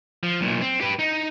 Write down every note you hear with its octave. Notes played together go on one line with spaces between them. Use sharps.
F3
B1 A#2
C4
G4 B4
D#4